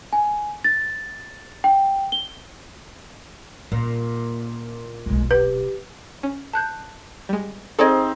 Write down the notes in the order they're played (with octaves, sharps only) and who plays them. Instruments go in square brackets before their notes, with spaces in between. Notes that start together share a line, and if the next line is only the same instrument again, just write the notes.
[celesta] G#5
A6
G5
G7
[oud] A#2 [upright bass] C#4
[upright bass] D#1 B1 [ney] G#3
[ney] G4 [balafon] B4
[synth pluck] C#4
[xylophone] A5 F#6 G6
[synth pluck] G3 G#3
[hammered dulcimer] C4 D#4 [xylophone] G#4 G#6 [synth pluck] A4 D5 D#5